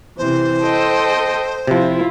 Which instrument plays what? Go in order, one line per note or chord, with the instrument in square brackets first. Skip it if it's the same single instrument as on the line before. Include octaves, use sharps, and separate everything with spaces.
[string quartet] C3 E3 [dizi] C5
[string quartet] A4 D#5 G5
[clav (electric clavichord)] C3 F3 [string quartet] E4 F4